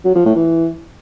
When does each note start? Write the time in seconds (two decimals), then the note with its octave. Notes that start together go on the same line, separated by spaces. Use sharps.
0.05 F#3
0.15 F3
0.25 A2
0.36 E3